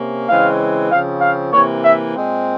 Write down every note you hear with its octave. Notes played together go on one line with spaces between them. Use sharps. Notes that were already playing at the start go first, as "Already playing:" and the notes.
Already playing: C3 A#3 C#4
C#3 E3 G#3 C4 F5
C#3 F3 C4 F5
F5
C3 E3 A#3 C#5
E5
A#2 G#3 C4